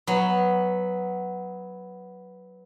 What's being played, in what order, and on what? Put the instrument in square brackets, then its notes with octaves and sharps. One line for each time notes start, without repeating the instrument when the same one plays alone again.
[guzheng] F#3 B3